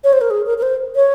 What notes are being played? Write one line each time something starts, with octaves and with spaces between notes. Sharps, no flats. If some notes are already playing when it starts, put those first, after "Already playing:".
C#5
C5
A#4
G#4
A#4
A#4
C5
C#5